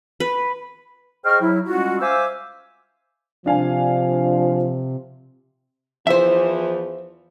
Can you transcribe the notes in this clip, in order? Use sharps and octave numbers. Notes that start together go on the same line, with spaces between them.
B4
G#4 C5 D#5 G5 C#6 F6
F#3 E4
G3 G#3 C#4 F4 F#4
C5 E5 F5 G#5 D6 E6
C3 F3 D4 F5 G#5
E2 E3 F3 C5 E5